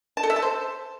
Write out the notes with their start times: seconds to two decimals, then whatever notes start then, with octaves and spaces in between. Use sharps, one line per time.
0.17 A5
0.23 A4
0.30 E5
0.36 A5
0.42 C5